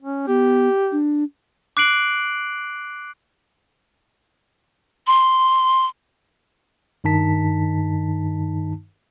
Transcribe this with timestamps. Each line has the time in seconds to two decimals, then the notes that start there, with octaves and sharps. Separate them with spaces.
0.03 C#4
0.27 B3 G4
0.92 D4
1.77 D6 F#6 C7 D7 F#7
5.07 C6
7.04 G2 D#3 D#4 A5 B6